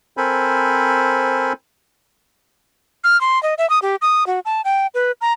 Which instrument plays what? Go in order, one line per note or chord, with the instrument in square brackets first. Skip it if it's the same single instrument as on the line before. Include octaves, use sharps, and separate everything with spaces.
[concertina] C4 A4 A#4 C5 G#5 B5
[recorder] F6
C6
D#5
E5
D#6
G4
D#6
F#4
A5
G5
B4
A#5